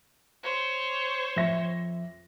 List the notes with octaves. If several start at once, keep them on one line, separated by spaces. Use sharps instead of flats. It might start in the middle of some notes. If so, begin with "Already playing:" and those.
C5 C#5
F2 E5 A#6